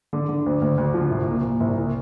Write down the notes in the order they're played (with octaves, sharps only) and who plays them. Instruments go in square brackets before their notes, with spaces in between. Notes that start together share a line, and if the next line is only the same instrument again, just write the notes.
[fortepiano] D3
D3
D2
D2
D2
F3
C2
A#2
A#2
C2
A#2